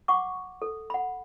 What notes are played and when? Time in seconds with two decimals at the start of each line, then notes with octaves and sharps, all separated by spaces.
0.08 F#5 C#6 D6
0.62 A4
0.90 F#5 B5